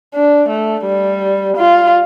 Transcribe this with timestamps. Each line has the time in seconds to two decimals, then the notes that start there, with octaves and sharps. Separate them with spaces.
0.14 D4
0.49 A3
0.86 G3
1.57 F4